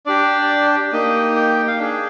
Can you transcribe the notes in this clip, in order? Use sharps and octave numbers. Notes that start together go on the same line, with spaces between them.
D4 G4 D5
A#3 D#4 G4 D#5
G5
F5
D4 G#4 G5